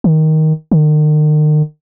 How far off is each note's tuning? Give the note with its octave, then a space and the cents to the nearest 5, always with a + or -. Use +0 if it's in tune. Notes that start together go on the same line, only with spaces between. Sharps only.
D#3 +10
D#3 -40